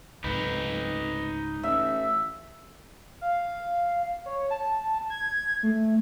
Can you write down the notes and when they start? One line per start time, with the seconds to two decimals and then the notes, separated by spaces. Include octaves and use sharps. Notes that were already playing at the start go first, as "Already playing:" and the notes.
0.24 F1 C#2 G#2 D#4 B4
1.63 A1 E5
3.21 F5
4.26 C#5
4.50 A5
5.10 G#6
5.63 A3